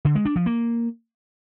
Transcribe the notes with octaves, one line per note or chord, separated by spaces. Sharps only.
D3
G#3
D4
F3
A#3